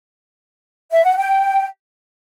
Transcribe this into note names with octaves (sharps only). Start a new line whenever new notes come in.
E5
F#5
G5